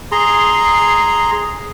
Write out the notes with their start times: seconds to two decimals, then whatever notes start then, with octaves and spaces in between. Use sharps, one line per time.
0.12 G#4 A#5 C6